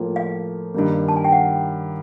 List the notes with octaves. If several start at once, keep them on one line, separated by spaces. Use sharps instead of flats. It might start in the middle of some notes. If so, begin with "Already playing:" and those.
Already playing: A2 F3 A#3
F5
G2 D#3 G3 A#3
A5
G#5
G5
F#5